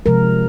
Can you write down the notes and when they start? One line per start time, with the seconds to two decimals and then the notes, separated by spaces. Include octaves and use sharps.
0.06 C3 F3 G#3 A#4